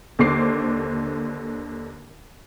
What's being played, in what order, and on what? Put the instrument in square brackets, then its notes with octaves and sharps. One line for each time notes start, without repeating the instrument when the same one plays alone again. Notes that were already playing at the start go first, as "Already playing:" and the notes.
[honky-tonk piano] D#2 D3 C5 D6 C7